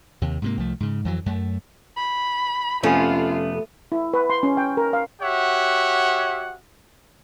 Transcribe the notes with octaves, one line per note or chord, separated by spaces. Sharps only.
D#2 C3
G#2 C3 A#3
C2 F3 A3
G#2 C#3
F2 E3 F#3
F#2 A3
B5
F2 C3 A3 B3 C#4 F4
E4
B4
C6
C#4
G5
A#4
F5
F#4 G4 C#5 E5 F#5